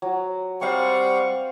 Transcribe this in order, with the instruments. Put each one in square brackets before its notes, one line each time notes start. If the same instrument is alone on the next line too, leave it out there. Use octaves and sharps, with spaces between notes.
[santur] F#3
[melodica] G3 F#5 C#6 [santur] C4 C5 F5